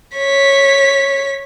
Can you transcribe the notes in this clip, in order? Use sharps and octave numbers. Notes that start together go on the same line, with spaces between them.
C#5 B6